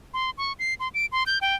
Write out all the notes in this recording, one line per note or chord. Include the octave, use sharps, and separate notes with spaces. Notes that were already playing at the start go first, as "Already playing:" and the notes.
C6
C#6
C7
C6
D7
C6
G6
G5